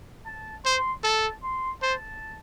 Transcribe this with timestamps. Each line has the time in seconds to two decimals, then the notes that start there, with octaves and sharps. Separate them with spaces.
0.26 A5
0.65 C5 C6
1.04 A4 A5
1.43 C6
1.82 C5 A5